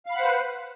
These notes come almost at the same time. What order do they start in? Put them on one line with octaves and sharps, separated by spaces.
F5 B5 F#5 C5 B4